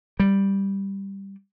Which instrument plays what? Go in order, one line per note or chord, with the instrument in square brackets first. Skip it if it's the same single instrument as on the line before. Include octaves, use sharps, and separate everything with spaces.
[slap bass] G3